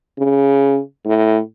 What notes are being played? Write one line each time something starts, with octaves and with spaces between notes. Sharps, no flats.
C#3
A2